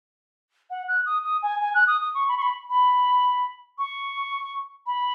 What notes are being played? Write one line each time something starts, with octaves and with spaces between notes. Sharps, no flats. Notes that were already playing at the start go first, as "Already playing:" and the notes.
F#5
F#6
D#6
D#6
G#5
G#5
F#6
D#6
D#6
C#6
B5
C#6
B5
B5
C#6
B5